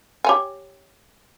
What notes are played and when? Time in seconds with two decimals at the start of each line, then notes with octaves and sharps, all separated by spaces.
0.24 G4 C#5 G#5